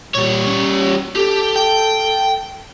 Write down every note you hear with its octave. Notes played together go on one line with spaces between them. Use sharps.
A#2 G3 C#5
C#4
G4 A4
G5